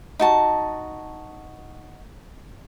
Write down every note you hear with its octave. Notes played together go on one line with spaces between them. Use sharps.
D#4 F#4 A5